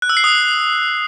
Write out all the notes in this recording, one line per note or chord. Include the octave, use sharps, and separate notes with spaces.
F#6
E6
C7
D#6